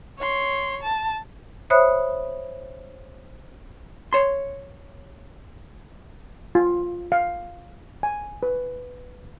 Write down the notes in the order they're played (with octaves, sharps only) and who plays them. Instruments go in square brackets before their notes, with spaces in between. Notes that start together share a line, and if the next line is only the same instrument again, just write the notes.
[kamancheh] C#5 C6
A5
[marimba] C5 C#5 E5 B5 D#6 F#6
[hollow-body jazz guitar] C#5 C6
[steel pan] F4
F5
G#5
B4